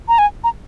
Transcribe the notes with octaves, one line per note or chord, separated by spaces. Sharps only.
A#5
G#5
A#5